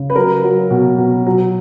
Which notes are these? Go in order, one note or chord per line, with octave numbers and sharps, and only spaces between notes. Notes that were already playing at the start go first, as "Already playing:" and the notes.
Already playing: C#3
B4
F#3 A#4
F#3
B2
B2
F#3